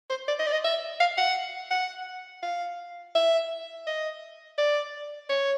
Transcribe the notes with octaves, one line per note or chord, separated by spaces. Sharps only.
C5
D5
D#5
D5
D#5
E5
F5
F#5
F#5
F5
E5
D#5
D5
C#5